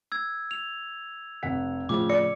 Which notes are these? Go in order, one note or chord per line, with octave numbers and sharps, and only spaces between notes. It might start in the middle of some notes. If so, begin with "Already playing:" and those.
E6 G#6
F7
F1 F#5 B6
A2 C#3 F3 D6
D5 D6 C#7